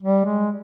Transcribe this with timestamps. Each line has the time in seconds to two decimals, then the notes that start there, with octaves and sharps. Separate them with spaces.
0.03 G3
0.25 G#3